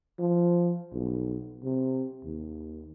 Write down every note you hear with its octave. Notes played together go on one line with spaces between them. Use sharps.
F3
B1
C3
D#2